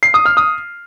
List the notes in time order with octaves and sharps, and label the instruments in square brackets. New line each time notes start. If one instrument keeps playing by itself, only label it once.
[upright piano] C7
D#6
F6
D#6